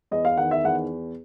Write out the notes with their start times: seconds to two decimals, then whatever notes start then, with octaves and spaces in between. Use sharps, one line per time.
0.11 E2 D#5
0.25 F5
0.37 D#3 F#5
0.51 E5
0.64 E2 F#5